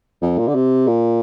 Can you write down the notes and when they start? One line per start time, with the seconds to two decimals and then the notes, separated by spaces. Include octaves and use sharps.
0.22 F2
0.38 A#2
0.48 D3
0.55 C3
0.87 A#2